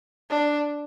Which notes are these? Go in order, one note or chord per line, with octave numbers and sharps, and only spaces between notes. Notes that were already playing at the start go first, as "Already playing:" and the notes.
D4